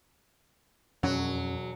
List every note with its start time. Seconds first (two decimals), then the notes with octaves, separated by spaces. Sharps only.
1.03 E1 F2 F#3 C#4